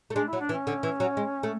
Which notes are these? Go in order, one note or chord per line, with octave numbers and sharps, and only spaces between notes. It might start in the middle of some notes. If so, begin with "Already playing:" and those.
A3
G#3 D4
F#3 E4
D4
E3
C#4
D3
E3
F#3
G#3
A3